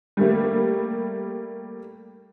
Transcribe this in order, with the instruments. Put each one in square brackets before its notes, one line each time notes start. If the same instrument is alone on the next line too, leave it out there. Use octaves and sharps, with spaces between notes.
[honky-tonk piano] G3 A3 A#3